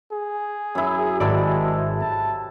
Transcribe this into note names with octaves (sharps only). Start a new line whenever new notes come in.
G#4
F#2 E4
G#1 C3 G#3 A4 D5 B5
A5